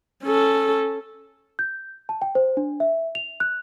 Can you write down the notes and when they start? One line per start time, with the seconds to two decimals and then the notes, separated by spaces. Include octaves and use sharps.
0.23 C#4 A4
1.59 G6
2.09 A5
2.22 G5
2.35 C5
2.57 D4
2.80 E5
3.15 F7
3.40 F#6